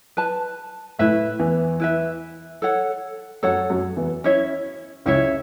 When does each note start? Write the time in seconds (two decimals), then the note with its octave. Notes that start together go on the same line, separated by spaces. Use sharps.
0.17 B4 A5
0.99 A2 A3 E4 B4 E5
1.39 E2 E3
1.80 E4 B4 E5
2.62 A4 C#5 F#5
3.43 F#2 F#3 A4 C#5 F#5
3.70 F#2 F#3
3.97 E2 E3
4.24 C#4 E4 C#5 E5
5.05 C#2 C#3 C#4 E4 C#5 E5